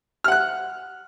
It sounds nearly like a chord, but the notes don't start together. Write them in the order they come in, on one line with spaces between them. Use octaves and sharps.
F6 F#5 F#6